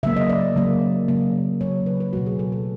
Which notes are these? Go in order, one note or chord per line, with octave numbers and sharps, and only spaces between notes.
C#3 F#3 A#3 E5
D#5
D5
C#3 F#3 A#3
C#3 F#3 A#3
C#3 F#3 A#3 C#5
B4
B4
B2 F#3 A3 F#4
G#4
A4
A4